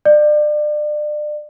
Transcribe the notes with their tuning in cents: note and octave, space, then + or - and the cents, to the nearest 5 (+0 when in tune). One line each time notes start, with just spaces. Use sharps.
D5 +30